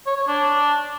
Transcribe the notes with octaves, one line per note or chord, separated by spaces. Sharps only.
C#5
C#5
D4